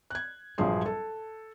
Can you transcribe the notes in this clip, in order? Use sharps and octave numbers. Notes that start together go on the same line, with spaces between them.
F#6 G#6
A#1 G2 F3 F#3 G#4 C6
A4